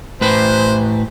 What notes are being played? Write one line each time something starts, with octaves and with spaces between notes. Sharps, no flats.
A2 B4 C5